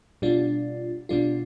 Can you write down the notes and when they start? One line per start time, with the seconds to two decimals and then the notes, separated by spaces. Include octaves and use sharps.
0.22 B2 G3 D4 F4
1.09 B2 G3 D4 F4